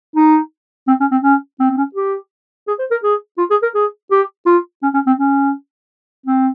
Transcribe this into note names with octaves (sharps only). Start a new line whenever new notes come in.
D#4
C4
C#4
C4
C#4
C4
C4
C#4
G4
G#4
C5
A#4
G#4
F4
G#4
A#4
G#4
G4
F4
C#4
C#4
C4
C#4
C4